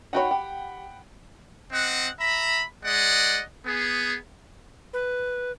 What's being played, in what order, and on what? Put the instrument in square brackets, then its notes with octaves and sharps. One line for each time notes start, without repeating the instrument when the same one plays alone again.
[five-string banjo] D#4 F#4 C#5 [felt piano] F#5 G5 B5
[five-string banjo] G4
[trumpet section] C4 D#5 F#5
E5 A#5 B5
G#3 D5 D#5 F#5
B3 G#4
[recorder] B4